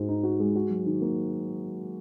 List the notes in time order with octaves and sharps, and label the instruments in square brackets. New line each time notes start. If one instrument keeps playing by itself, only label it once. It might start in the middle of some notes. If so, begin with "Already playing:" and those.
Already playing: [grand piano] G#2 G#3 F#4
D#4
F#4
G#3
F#4
F#3
D#3
A#3